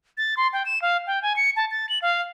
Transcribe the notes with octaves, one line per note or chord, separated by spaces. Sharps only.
A6
C6
G5
E7
F5
G5
G#5
C#7
A5
A6
F#7
F5